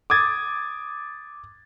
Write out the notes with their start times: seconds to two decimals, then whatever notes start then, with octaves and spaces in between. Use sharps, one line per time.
0.10 D6 D#6 G#6 A6